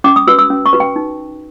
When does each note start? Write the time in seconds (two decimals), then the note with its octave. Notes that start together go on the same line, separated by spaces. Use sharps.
0.04 C#4 D6
0.16 D#6
0.27 F#4 B4 E6
0.39 E6
0.50 C#4
0.66 C#6
0.73 F#4 B4
0.80 G5
0.96 D#4